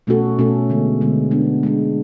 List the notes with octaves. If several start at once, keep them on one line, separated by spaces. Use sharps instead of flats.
B2 A3 C#4 F#4 A4
B2 A3 C#4 F#4 A4
D3 G#3 B3
D3 G#3 B3
G#3 B3 D4
G#3 B3 D4